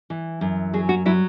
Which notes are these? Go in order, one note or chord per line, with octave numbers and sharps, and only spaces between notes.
E3
F#2
F#3 G#4
F#4
F#3 E4